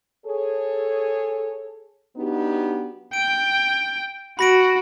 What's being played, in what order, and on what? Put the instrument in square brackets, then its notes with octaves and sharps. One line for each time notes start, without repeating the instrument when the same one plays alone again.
[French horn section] G#4 A4 C#5
F#3 B3 D4 D#4 F#4 G4
[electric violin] G5 [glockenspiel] D7
[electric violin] F#4 [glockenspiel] B5 A#6 D7